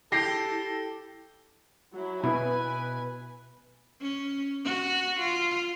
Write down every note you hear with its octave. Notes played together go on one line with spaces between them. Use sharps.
E4 G4 A4 A#6 C7
F#3 E4
B2 B3 E4 B4 G#5
C#4
F#4
F4